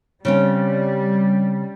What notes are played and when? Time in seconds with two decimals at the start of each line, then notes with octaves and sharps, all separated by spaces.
0.25 C#3 G3 C4 C#4